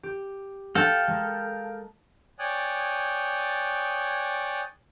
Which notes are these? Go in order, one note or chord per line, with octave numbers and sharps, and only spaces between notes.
G4
A4 F5 G5
G#3 A#4
C#5 D5 G5 G#5 D#6 F#6